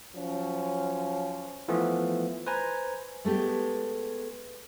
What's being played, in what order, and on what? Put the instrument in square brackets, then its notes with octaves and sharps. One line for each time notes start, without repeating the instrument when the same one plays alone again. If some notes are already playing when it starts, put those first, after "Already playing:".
[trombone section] F3 F#3 C#4
[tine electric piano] E3 F3 A3 B3 F4
B4 C5 G#5 A#5
[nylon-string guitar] G#3 A3 B3 G4